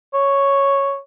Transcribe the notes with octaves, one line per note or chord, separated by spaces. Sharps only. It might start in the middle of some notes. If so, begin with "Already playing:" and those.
C#5